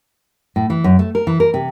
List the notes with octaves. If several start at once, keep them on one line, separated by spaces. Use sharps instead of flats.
A2
E3
F#2
A3
A#4
E3
A#4
C3